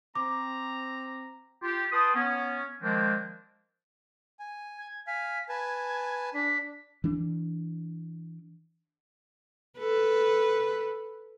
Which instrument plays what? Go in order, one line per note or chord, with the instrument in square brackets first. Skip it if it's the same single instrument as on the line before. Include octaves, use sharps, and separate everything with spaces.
[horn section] C4 A#5 [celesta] D6
[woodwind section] F4 G4
B4 G5 A5 C6 D#6
B3 C#4
D#3 F3 G#3 A#3 C4 D4
[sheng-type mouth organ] G#5
[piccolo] G#6
[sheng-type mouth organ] F5 G#5 [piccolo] B6
[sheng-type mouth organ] B4 G#5 A5 [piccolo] G#6
[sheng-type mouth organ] D4 [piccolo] B6
[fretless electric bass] E3 D4
[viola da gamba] A4 B4